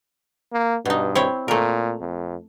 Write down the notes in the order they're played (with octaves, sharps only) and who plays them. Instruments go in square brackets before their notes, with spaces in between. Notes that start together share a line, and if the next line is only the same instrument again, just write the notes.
[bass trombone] A#3
[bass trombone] G2 [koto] B2 D#4
[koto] C4 E4 C#5
[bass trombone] A#2 [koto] A3 A#4
[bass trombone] F2